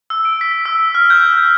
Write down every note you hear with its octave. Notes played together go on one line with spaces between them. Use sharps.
E6
D7
B6
E6
F6
G6